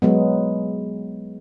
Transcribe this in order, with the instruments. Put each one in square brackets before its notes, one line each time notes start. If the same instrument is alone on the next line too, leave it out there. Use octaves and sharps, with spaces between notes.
[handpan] F#3 G#3 B3